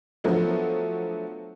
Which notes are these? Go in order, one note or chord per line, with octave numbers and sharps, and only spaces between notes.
F3 F#3 A3 B3 D4